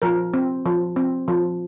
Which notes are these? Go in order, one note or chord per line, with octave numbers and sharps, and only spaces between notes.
F3 A#4
C4
F3
C4
F3